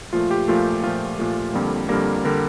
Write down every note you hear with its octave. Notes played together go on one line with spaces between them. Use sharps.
A#2 F3 A3 F4
G4
A#2 F3 A3 F4
A#2 F3 A3 F4
A#2 F3 A3
F2 D3 G3 A#3
F2 D3 G3 A#3 A#4
D3 G3 A#3 A#4